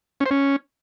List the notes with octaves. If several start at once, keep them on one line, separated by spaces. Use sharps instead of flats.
C#4
C5
C#4